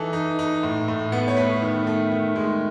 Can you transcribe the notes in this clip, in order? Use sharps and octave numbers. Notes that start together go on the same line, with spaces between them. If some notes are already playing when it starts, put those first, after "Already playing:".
Already playing: E3 D#4 A4
D#4
D#4
A2
A2
B3
C#5
A3 B4
D#3
A3
D#3
G#3